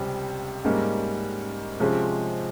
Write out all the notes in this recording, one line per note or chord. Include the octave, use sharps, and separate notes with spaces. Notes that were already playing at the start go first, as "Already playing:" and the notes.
Already playing: C#2 C3 G3 C#4
G#2 G3 A#3 C#4
C3 F3 G#3 C#4